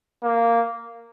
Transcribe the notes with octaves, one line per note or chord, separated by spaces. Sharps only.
A#3